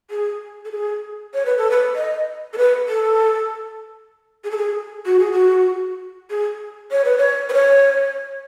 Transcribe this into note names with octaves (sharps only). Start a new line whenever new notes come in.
G#4
A4
G#4
C#5
B4
A4
B4
D#5
A4
B4
A4
G#4
A4
G#4
F#4
G#4
F#4
G#4
C#5
B4
C#5
B4
C#5